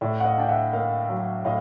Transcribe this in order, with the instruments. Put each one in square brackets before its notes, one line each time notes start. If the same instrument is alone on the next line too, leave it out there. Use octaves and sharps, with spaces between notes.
[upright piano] A2 [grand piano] D5 E5
[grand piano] F#5
D#5 F5
[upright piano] D4 [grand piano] G5
[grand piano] E5 F#5
[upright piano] A#3 [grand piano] D#5 F5
[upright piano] F#3
[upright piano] A2 [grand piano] D#5 F5